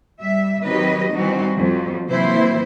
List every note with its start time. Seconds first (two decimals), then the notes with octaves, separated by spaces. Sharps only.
0.20 G3 E5
0.64 D#3 F#3 C4 G4 B4 D#5
1.13 E3 G3 C4 D#4 F#4
1.55 F2 F#3
2.08 C3 E3 F#3 A#3 E4 C5